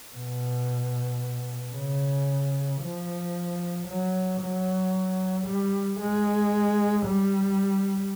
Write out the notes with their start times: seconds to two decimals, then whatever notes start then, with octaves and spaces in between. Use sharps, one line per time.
0.16 B2
1.75 C#3
2.82 F3
3.87 F#3
4.41 F#3
5.46 G3
6.00 G#3
7.06 G3